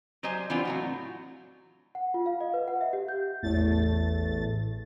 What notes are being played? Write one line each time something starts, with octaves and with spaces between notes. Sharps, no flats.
F#3 G4 C5 D#5 G#5
E3 B3 C4 D4 F4
A2 F#3 F#4
F#5
F4
F5
D#5
B4
F#5
E5
G4
G6
A1 E2 A2 A3 A6